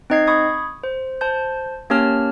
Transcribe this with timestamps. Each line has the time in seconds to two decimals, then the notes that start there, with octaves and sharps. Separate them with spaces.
0.10 C4 D#4 D#5 G#6 C7
0.27 B5 C#6 D#6 G#6
0.84 C5
1.21 C5 A5 G6
1.90 A#3 C#4 G4 C#5 A5 F6